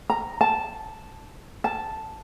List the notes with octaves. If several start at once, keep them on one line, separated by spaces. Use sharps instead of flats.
A#5
A5
A5